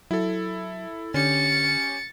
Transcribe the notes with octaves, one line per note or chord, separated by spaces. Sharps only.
F#3 E4 A4
D3 C#4 G4 A6 C#7